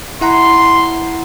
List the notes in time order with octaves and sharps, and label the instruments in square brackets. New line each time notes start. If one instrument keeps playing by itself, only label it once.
[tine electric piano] E4 F#5 A#5 [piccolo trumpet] C6